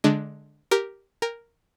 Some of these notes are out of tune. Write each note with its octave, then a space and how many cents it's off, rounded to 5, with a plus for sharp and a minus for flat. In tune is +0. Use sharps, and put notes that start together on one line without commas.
D3 +0 G#3 +15 D4 +5
G4 -5 A#4 +0
A#4 +0 G5 +35